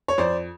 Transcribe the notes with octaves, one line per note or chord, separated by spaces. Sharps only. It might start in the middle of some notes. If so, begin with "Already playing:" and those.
C#5
F2 C5 D5